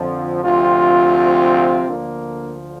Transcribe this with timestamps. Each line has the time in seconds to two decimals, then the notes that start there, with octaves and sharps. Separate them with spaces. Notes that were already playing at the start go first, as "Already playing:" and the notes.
Already playing: F2 D3 F3
0.42 D2 C3 F3 C4 F4
1.87 D2 D3 F3 A#3 D4